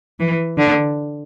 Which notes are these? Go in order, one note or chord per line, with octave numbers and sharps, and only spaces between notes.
E3
D3